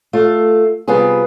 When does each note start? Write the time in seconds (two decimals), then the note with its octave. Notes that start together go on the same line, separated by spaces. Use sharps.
0.13 A3 F4
0.88 C3 G3 B3 F4 G#4